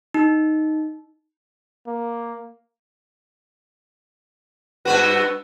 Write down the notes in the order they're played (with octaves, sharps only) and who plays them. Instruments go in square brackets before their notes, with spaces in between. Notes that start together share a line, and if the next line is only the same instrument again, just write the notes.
[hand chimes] D#4
[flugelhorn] A#3
[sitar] G2 B3 F#4 [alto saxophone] B4